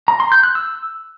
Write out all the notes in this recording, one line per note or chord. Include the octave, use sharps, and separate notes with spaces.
A#5
C6
G6
F#6
E6